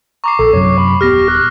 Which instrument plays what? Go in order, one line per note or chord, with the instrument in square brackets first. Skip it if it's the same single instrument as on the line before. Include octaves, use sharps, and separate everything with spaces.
[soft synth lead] A#5 [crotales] C#6 D6 C7
[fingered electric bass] A#1 [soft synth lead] A4
[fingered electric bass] F#2 C3 F#3 [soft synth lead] C#5
[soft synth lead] B5
[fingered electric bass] D#1 B3 [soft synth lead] G4 [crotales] F6 A#6
[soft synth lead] F#6